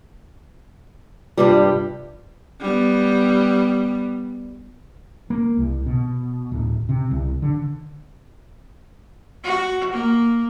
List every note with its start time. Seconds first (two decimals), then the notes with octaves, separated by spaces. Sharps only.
1.38 G2 C3 G3 F4 B4
2.61 G3 B3
5.30 A#3
5.57 C2
5.86 B2
6.52 D1
6.89 C3
7.11 C2
7.42 D3
9.43 F#4
9.92 A#3